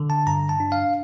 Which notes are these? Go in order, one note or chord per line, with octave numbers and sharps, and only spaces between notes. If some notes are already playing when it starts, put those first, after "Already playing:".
Already playing: D3
A5
G2 A#5
A5
D4
F5